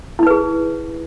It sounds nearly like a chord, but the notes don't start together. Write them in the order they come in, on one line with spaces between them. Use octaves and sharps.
E4 D#4 B4 G#4